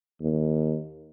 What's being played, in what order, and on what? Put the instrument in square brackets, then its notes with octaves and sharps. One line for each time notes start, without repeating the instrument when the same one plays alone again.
[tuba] D#2